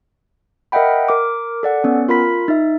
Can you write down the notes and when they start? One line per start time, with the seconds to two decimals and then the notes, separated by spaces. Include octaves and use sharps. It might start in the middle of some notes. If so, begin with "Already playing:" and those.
0.72 A#4 D#5 E5 F#5 G5 B5
1.08 A#4 D6
1.63 A4 D5 F#5
1.84 B3 C#4
2.09 F4 A#4 B5 B6
2.48 D#4 E5